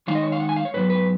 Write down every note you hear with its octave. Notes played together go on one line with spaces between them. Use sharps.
D#3 G#3 D#4 F5
D#5
C#5
F5
F#5
G#5
F5
C#5
G#2 F#3 B3 B4
B4